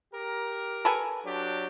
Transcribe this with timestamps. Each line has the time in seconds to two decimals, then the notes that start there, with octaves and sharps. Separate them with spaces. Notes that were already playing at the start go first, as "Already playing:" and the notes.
0.13 G4 A#4
0.85 A4 B4 G#5
1.25 F#3 D4 G4